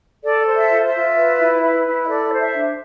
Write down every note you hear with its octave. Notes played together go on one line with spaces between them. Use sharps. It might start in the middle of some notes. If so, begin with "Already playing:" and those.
A4 D5
C5
E5
F4
E5
F4
B4
E4
B4
E4
E5
A4 D5
C5
E5
D4